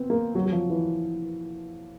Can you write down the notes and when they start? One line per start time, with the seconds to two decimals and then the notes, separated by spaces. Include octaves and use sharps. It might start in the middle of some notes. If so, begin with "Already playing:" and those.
Already playing: B3 C4
0.10 A#3
0.35 F#3
0.46 F#3
0.52 F3
0.70 E3